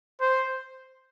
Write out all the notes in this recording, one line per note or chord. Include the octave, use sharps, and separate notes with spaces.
C5